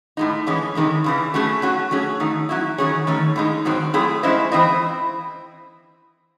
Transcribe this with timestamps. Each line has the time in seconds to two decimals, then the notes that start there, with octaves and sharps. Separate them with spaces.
0.17 A2 G#3 D#4
0.46 F#2 E3 G#3 C#4
0.75 C3 D#3 G#3 C#4
1.04 E2 C#3 E3
1.34 F#3 A3 C#4 G#4
1.62 F#3 C#4 F#4
1.91 F#3 A3 C#4 G#4
2.20 D#3 A3 D#4
2.49 F#3 C#4 E4
2.78 D#3 F#3 C#4 G#4 C#5
3.07 D#3 A3 C#4
3.36 A2 G#3 D#4
3.65 G#2 D#3 F#3 C4
3.93 F#3 A3 C4 E4 G#4
4.23 G#3 C#4 E4 C5 D#5
4.52 E3 C4 E4 C5 D#5